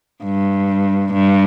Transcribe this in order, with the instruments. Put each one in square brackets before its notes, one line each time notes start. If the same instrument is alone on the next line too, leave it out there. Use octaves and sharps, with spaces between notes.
[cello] G2
G2